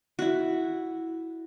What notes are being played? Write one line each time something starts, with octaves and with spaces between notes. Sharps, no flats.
E4 F#4